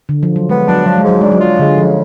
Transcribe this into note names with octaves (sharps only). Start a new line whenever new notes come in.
D3
F3
F#3
G#3 B3
F#3 D4
F3 F#3
G#3
G#2 F#3
G#3 D4
F#3
F4
D3 G#3
C#3 F3